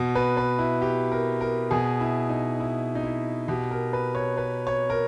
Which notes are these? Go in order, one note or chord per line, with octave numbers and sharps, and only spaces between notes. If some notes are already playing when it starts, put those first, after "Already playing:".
Already playing: B2
B4
B4
E4
G4
A#4
A#4
B2 G#4
E4
D#4
E4
D#4
E4
B2 G4
A#4
B4
C#5
B4
C#5
A#4